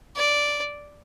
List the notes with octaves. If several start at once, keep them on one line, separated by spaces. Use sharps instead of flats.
D5